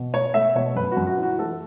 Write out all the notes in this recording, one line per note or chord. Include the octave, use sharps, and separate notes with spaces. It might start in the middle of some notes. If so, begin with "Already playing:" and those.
Already playing: B2
A3 C#5
A3 E5
B2 C#5
F#2 B4
F#4
F#2
F#4
E3
F#4
A3 A4